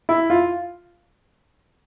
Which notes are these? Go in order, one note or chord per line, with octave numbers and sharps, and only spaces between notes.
E4
F4